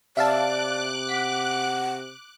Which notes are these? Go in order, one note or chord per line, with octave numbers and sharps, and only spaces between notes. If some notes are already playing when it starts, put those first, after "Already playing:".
C3 D5 E5 F5 A5 D6 F#6
F#5 B6